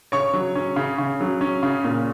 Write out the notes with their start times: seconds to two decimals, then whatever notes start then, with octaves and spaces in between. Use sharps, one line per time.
0.12 C#3 C#5 C#6
0.33 F#3
0.55 C#4
0.76 C#3
0.98 C#3
1.21 F#3
1.41 C#4
1.63 C#3
1.84 A#2